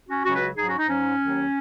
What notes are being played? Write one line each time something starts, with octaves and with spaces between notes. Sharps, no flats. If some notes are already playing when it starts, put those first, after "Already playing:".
C#4 F#4
C#2 C#3 F#3 C#4 F#4
F#4 B4
G#2 F#3 D#4 G#4
C#4 F#4
D#4
G#2 F#3 C#4
D#2 D#3 F#3